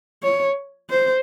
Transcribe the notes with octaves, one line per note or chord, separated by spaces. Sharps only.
C#5
C5